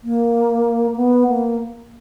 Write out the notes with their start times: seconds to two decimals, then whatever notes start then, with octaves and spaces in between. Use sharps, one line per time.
0.04 A#3
0.96 B3
1.28 A#3